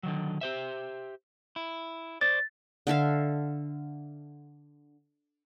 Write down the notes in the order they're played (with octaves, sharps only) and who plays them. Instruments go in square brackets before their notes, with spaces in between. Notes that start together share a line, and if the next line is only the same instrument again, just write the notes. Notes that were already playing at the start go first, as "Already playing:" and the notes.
[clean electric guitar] D3 D#3 F#3
G4 C5 E5
E4
[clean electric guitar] C5 D5 [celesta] A6
[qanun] D3 A4 E5 F5